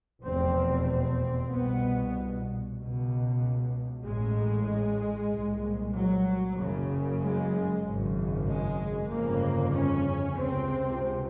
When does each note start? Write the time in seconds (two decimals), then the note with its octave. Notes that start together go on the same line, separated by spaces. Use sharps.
0.23 F1 E2 B2 C4
0.87 C4
1.50 C2 B2 B3
2.77 C#2 B2
4.04 A1 A2 G#3
5.31 C2 A#2
5.94 F#3
6.57 F#1 F#2 C#3
7.21 G#3
7.83 G#1 F#2 C#3
8.47 G#3
9.11 G1 F2 C#3 A#3
9.73 C#4
10.37 C#2 C3 C4